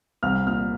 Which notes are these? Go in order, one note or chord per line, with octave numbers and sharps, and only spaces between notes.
C2 F6
A#2 F6